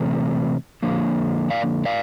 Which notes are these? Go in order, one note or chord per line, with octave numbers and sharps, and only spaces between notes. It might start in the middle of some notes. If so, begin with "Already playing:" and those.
Already playing: C3 E3 A3
D3 F3 A#3
D5 F5
D5 F5